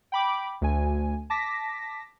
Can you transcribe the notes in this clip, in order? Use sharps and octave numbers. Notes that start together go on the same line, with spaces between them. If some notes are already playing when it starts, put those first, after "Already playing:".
G5 B5 D6
D2 G#5
A5 D6 A#6 B6